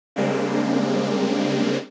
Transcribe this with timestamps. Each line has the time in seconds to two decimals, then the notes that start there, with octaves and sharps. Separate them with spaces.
0.16 C#3 G3 G#3 A#3 C4 D4